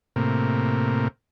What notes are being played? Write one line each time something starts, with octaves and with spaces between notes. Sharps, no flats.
A2 C3 A#3